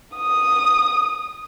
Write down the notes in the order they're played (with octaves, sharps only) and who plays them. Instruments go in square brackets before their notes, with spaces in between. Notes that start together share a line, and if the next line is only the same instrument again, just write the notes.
[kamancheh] D#6